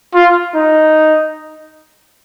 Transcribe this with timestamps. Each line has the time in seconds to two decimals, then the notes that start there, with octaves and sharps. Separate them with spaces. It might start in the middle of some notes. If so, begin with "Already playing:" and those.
0.14 F4
0.55 D#4